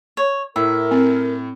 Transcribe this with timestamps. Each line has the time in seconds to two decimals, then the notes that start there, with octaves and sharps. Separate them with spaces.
0.17 C#5
0.56 A2 A#4 E5
0.91 C4